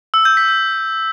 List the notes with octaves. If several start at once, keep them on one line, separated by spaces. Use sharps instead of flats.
E6
G6
B6
G6